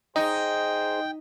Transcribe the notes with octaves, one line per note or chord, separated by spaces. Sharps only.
D#4 G#4 C5 D#5 G5